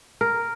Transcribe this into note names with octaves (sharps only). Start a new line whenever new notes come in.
A#4